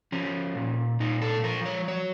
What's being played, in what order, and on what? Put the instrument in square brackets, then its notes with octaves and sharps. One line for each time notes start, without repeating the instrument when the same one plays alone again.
[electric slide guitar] F3 C#4
A#2
A#2 D#4
A4
F3 A#4
C#5
F#3 C#5